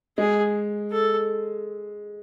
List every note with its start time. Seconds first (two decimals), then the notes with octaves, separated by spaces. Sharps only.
0.18 G#3 G#4
0.92 A4